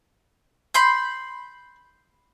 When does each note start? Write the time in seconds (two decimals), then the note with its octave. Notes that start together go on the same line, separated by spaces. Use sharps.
0.74 B5 C6 G6